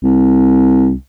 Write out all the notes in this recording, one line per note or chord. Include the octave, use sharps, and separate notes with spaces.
C2